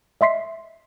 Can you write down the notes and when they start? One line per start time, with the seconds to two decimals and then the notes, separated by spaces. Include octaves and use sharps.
0.21 D#5 E5 C6 B6 C7